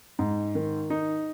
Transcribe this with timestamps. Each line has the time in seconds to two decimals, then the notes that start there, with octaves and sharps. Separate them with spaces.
0.19 G#2
0.55 D#3
0.90 D#4